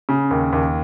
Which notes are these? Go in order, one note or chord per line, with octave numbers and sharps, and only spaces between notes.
C#3
D#2
D#2